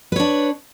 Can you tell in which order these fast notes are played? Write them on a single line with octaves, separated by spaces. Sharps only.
B4 C#5 D4